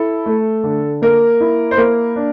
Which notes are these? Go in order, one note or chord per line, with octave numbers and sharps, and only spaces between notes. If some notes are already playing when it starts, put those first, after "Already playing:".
Already playing: E4 A4
A3
D3
A#3 A#4
E4
C5
A#3 A#4
D4